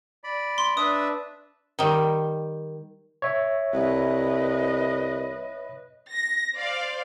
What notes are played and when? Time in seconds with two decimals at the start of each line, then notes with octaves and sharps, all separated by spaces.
0.24 D5 B5
0.58 C6
0.77 D4 B4 E5 D#6
1.79 D#3 G3
3.22 C#5 E5
3.73 C2 B4 D#5
6.13 A#6
6.55 C5 D5 F5